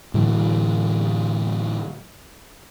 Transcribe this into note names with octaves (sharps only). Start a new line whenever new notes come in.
A2 D3 E3 F#3